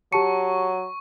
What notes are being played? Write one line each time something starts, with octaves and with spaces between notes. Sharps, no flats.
F#3 G4 A5 C#6 C#7